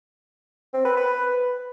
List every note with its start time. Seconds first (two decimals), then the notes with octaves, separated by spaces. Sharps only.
0.74 C4
0.85 B4
0.97 B4